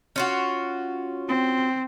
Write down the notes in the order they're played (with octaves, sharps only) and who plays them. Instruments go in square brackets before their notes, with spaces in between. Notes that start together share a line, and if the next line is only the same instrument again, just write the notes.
[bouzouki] C#4 F4 F#4
[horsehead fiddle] C4